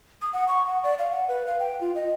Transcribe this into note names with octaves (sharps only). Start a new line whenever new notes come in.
D#6
F#5
C#6
F#5
D5
F5
F#5
B4
F5
G5
F4
D#5